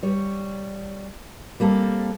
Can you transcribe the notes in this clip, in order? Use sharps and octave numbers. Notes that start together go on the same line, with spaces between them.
G3 C#5
G3 A#3 C4 A4